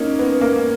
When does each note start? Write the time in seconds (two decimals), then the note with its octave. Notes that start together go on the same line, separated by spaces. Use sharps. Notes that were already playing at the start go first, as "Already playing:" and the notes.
Already playing: A#3 C#4 D#4
0.19 B3
0.41 A#3